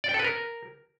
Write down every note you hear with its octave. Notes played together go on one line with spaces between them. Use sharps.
D5
G5
A4
B4
A#4